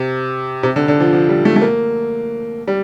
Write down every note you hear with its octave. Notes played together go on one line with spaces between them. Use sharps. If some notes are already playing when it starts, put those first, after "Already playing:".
Already playing: C3
C3
D3
D3
F3
F3
G3
A3
A3
A#3
G3